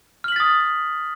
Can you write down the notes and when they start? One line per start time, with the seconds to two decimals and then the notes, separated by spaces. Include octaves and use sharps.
0.24 F6
0.28 F#7
0.32 B6
0.36 A6
0.40 D#6